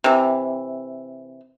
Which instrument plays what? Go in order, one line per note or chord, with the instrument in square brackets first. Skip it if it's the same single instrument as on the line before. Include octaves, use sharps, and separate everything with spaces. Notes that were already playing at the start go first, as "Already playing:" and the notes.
[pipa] C3 E3